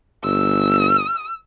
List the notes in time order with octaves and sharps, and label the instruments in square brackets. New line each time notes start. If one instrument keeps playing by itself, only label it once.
[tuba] G1 [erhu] E6